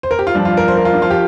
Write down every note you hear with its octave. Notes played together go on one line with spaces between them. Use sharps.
C5
A#4
G4
F4
G2 F3 D4
F4
A#4
C5
A#4
F4
D4
F3 F4
G4